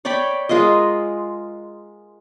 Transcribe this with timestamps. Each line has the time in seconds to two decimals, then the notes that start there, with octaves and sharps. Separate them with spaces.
0.05 C#5 D5 G5 B5
0.49 G#3 F4 A#4 D#5